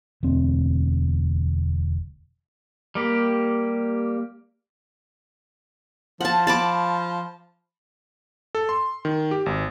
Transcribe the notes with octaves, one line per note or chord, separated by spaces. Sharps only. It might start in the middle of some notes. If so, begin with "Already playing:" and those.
E1 D2 C4
G3 A#3 G4
F3 F#5 A5
A5 B5 D6
A4
C6
D#3
G4
G#1